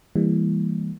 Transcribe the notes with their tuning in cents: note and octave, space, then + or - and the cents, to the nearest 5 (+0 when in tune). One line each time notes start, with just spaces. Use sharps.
E3 +0 G3 +35 A#3 +0